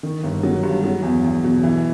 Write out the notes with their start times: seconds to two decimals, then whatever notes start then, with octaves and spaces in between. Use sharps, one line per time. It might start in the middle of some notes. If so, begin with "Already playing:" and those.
0.03 D#3
0.23 G1
0.43 F#3
0.63 G2
0.84 F#3
1.03 E2
1.24 E2
1.44 B2
1.63 E3